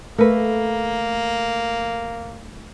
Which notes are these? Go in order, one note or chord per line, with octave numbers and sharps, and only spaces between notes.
A3 A#3 A#4 B4